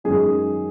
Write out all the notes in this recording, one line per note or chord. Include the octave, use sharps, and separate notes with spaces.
F#2 D#3 G#3 C#4 G#4